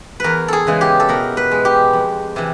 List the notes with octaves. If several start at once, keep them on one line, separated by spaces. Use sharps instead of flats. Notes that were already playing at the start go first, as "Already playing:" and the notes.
E2 A#4 B4
G#4 A4
C#3 E3 G#3
G4
A4
B2 A#4
B4
G#3
G4
F2
C3 E3